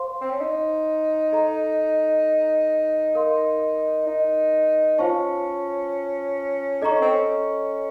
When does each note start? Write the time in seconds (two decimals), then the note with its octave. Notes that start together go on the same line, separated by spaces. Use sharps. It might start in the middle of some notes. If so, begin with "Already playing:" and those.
Already playing: C5 F5 C6
0.21 C4
0.31 C#4
0.40 D#4
1.32 A4 D#5 A#5
3.15 A#4 F5 C6
4.07 D#4
4.99 C#4 F4 C5 F5 A5 C#6
6.82 D#4 A4 D#5 A#5 C#6
6.91 C#4
7.02 C4
7.12 C#4